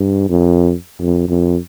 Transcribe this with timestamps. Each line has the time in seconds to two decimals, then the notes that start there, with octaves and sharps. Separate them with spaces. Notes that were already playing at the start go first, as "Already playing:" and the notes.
Already playing: G2
0.29 F2
0.99 F2
1.28 F2